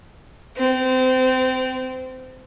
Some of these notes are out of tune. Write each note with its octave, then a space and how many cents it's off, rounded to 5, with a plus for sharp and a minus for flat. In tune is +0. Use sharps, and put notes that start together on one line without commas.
C4 -25